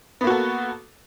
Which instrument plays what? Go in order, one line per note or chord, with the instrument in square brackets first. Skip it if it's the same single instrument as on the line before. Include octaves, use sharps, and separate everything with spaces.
[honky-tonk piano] B3
A#3
F#4
A4